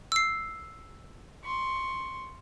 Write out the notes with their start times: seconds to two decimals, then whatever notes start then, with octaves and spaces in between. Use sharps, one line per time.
0.12 E6 C7
1.45 C6 C#6